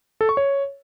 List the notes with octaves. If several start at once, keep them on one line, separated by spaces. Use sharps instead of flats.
A4
C#6
C#5